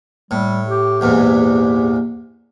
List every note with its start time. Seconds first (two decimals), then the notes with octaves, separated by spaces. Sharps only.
0.31 A2 G3
0.68 G4
1.01 A#1 E2 G#2 G4